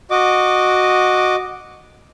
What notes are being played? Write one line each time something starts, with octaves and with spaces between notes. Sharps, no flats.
F#4 D#5 D6